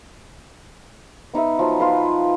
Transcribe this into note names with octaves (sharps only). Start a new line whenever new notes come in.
B3 D#4 B4 E5
F3 F#3 F4
F4 B4 C6